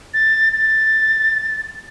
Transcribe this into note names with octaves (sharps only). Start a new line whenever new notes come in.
A6
A6